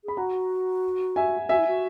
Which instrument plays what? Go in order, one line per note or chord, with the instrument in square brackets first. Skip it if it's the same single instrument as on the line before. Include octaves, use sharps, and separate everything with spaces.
[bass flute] G#4 [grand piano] B5
[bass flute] F#4 [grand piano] F#5 A#5
[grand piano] E5 G#5
[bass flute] F#4 [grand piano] E5 G#5
[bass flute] E4
F#4